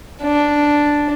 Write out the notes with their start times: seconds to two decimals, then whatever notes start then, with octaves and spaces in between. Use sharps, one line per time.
0.22 D4